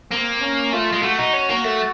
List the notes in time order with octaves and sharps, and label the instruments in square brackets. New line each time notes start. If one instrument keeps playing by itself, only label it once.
[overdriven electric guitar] A#3 [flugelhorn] C4
[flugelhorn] C#4
[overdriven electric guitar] A3 [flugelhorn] F4
[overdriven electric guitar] G#3
[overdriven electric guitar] A3 [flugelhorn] F#4
[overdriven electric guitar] D#4
C#4
A#3
A3